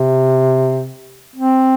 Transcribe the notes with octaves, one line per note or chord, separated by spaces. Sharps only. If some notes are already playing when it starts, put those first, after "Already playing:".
Already playing: C3
C4